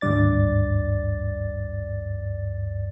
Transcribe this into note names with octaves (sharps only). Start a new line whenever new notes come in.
G#1 D2 G2 D5 A6